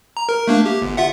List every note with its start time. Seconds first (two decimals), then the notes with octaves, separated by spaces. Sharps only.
0.17 A#5
0.29 A#4
0.47 A3 A#3 D4
0.66 G4
0.82 G1
0.97 F4 E5 F#5